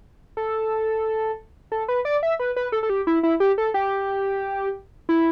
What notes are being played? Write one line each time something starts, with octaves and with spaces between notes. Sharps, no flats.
A4
A4
B4
D5
E5
B4
B4
A4
A4
G4
E4
E4
G4
A4
G4
E4